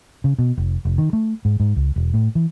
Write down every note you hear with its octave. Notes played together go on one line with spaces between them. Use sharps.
C#3
B2
F1
F1
D#3
A3
G#2
G#2
C#2
E1
A2
E3